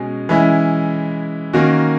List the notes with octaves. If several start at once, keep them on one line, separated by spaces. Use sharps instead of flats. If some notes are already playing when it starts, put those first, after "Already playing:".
Already playing: B2 G#3 C#4
E3 G#3 C#4 E4
D#3 A#3 C#4 F#4